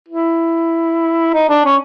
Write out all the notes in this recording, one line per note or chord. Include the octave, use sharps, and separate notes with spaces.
E4
D#4
D4
C#4